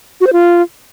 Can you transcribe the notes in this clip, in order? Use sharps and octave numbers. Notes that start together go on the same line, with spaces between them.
F#4
C5
F4